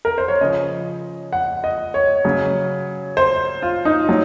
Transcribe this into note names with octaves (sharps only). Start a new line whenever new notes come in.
A#4
C5
C#5
C#3 F3 D#5
F#5
D#5
C#5
C#3 F#3
C5
F4
D#4
F#3